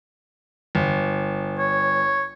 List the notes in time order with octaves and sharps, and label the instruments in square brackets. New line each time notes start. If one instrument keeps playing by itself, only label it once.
[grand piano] G1
[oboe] C#5